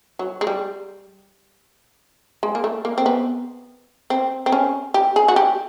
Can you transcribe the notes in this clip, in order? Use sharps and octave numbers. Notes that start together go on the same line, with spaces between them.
F#3
G#3
G3
G#3
A#3
A3
A#3
C4
B3
C4
C4
C#4
G4
G#4
F#4
G4